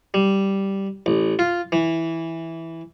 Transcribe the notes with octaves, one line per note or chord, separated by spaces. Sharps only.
G3
A1
F4
E3